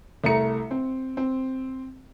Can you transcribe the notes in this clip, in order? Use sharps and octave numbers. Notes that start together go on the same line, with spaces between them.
C2 A3 A#5 C#7
C4
C4